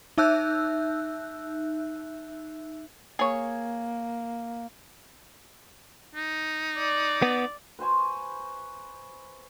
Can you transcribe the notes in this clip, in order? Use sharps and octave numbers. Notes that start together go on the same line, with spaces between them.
D#4 E5 E6 F#6 G6
A#3 G#4 C#5
D#4
D5
B3
B4 C5 G#5 C#6